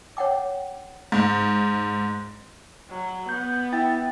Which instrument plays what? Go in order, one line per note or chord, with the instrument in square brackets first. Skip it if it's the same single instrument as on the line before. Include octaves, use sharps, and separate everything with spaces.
[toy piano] C#5 F#5 G5 D6
[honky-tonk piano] G#2
[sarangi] F#3
[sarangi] B3 [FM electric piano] G6
[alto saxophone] E4 [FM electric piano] G5 A6